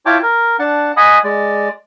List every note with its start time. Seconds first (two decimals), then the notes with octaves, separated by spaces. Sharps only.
0.06 E4 F4 C#5 G5 A5 D6
0.23 A#4
0.59 D4 F#5 A5
0.97 D#5 F#5 G#5 B5 D#6
1.24 G#3 D5